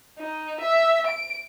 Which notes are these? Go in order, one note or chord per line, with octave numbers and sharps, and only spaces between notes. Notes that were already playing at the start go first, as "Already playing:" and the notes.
D#4
E5
D7